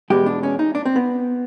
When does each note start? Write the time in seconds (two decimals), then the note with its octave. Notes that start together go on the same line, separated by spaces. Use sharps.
0.10 E2 B2 G#3 G4
0.26 D4
0.43 C#4
0.59 D#4
0.75 D4
0.85 C4
0.96 B3